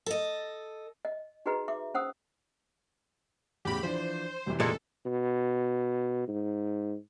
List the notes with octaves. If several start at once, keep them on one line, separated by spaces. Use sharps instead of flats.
A4 D#5
D#5
D#4 F#4 G#4 B4 D#5 A#5
E5 D6
C#4 C5 F#5 D#6 E6
E2 A2 C#3 G4 B5
E3 F3 D4 C5
F1 C3 E3
A#2 G#3 A4
B2
G#2